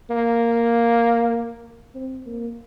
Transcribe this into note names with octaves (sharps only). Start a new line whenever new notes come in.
A#3
C4
A#3